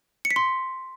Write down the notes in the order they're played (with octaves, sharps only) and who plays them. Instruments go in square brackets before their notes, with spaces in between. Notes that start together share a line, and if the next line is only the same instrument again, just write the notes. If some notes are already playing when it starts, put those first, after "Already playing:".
[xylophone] C#7
B6
C6